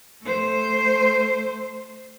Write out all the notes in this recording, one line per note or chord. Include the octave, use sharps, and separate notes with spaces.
A3 C5